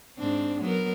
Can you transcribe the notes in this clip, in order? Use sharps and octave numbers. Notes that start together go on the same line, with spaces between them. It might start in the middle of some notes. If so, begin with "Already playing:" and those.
G#2 C4 D4
F#3 B3 A#4